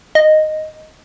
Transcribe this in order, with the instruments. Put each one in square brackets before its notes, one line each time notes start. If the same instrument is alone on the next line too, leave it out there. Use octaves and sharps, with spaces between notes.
[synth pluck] D#5